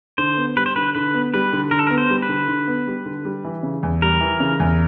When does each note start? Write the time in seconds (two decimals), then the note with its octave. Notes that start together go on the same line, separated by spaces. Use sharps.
0.18 D3 C5
0.37 B3
0.56 G3 B4
0.66 C5
0.76 D3 B4
0.95 D3 B4
1.14 B3
1.34 G3 B4
1.53 D3
1.71 D3 A#4
1.79 A4
1.87 A#4
1.90 B3
1.98 C5
2.10 G3
2.22 B4
2.29 D3
2.48 D3
2.67 B3
2.87 G3
3.06 D3
3.25 G3
3.44 E3
3.63 C#3
3.83 E2
4.02 G3 A#4
4.21 E3
4.40 C#3
4.60 E2